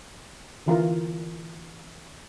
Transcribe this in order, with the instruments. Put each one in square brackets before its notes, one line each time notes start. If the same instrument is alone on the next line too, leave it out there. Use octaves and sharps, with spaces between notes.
[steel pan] D3 E3 F4 A#4